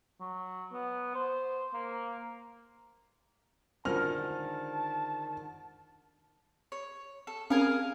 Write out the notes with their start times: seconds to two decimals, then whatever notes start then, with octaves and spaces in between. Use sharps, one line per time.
0.20 F#3
0.72 B3
1.15 C5
1.74 A#3
3.85 D3 D#3 G#3 F4 A#4 C5 A5 F6
6.72 C#5
7.27 A4
7.50 C4 C#4 G#4 A#4 F5